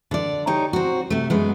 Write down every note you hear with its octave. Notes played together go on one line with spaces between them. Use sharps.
D3 D5
D#4 G4 C#5
C4 F#4
C3 A3
F#2 G#3 B3